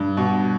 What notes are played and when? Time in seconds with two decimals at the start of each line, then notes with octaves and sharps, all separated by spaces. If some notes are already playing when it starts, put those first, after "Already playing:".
Already playing: G2
0.17 B2